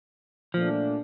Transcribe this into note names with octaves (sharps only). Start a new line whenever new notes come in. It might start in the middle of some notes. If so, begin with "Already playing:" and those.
A#2 F3 A3 D4